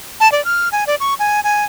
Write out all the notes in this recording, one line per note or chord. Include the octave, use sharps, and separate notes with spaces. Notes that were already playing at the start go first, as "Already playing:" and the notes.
A5
D5
F6
G#5
D5
C#6
G#5
G#5